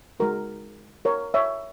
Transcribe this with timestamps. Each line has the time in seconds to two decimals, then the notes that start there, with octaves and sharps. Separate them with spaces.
0.20 G#3 D#4 F#4 A#4
1.05 A#4 C#5
1.34 C#5 E5